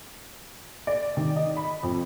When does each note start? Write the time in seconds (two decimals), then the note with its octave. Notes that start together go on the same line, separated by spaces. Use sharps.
0.87 D5
1.17 D#3
1.36 D#5
1.57 B5
1.83 F2